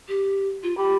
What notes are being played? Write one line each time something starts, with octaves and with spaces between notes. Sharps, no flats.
G4
F4
G4 B5